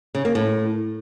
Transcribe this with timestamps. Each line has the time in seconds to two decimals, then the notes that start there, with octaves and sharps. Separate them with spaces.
0.15 C#3
0.25 A#3
0.35 A2